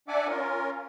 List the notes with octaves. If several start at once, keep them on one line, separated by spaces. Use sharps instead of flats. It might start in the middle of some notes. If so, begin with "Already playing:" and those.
D4 D5 E5 F#5 G#5 D6
C#4 F4 A#4